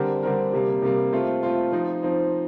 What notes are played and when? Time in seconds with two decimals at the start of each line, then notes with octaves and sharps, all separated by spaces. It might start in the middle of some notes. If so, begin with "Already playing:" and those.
Already playing: D3 G3 C4 G4 A#4
0.23 D3 G3 C4 G4 A#4
0.53 C3 G3 A#3
0.82 C3 G3 A#3
1.13 A3 C4 F4
1.43 A3 C4 F4
1.72 F3 C4 D#4
2.02 F3 C4 D#4